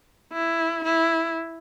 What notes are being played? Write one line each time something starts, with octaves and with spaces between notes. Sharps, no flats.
E4
E4